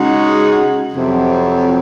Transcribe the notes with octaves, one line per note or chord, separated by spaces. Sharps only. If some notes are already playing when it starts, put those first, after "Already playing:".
Already playing: C#3 G#3 D#4 F#4
F2 C3 F#3